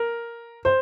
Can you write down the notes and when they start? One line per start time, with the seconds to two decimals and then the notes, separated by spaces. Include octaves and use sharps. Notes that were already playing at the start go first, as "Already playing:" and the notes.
Already playing: A#4
0.65 C5